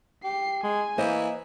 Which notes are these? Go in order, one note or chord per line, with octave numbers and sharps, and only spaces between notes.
G4 C7
G#3 G#5
E3 A#3 C5 D#5